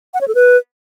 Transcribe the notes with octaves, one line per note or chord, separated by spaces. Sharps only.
F#5
C#5
A4
B4